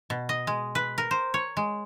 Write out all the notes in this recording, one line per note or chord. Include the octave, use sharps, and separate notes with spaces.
B2
D#5
G#3
B4
A#4
C5
C#5
G#3